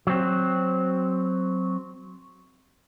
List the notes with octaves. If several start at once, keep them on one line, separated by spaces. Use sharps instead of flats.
F#3 C4